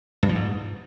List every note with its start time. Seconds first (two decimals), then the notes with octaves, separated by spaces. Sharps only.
0.23 G2
0.29 F3
0.35 G#2